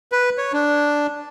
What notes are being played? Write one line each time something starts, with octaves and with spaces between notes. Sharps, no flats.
B4
C#5
D4